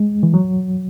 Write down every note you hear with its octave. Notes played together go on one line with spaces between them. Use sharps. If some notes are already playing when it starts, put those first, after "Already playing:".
Already playing: G#3
E3
F#3